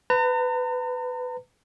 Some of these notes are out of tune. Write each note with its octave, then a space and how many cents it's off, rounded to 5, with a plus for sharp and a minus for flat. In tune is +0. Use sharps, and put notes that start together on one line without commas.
B4 +20 A#5 -40